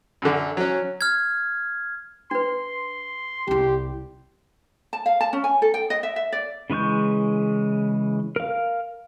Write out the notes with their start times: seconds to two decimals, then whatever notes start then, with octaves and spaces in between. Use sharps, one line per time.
0.22 F#2 D3
0.57 F#3 C#4
1.01 F6 G#6
2.31 D4 B4 C6
3.47 C2 E4 G4
4.93 A5
5.06 F5
5.21 A5
5.33 C#4
5.44 G#5
5.62 A4
5.74 G5
5.90 D#5
6.03 E5
6.16 E5
6.33 D5
6.70 C#3 E3 G#3 C#6 G6
8.36 A#4 F5